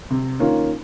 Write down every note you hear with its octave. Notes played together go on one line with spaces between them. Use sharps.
C3
D#3 A#3 C#4 F4